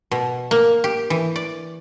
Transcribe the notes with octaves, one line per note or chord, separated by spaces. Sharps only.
B2
A#3
G4
E3
D5